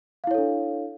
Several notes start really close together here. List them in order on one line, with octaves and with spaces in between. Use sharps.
F5 E4 C#5 A4 D4